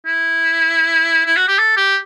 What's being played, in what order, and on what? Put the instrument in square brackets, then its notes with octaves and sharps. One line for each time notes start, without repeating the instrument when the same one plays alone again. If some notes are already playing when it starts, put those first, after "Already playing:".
[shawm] E4
E4
F#4
G4
A4
G4